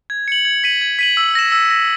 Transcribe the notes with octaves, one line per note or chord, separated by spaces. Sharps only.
G#6
C#7 F#7
G#6
B6 D#7 F#7
G#6
B6 D#7 F#7
E6
A#6 E7
E6
A#6 E7